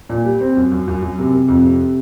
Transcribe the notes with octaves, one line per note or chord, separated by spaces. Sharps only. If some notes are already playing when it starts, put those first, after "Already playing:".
A#2
G3
C4
F#2
F#2
F#2
F#2
C3
C3
F2
C3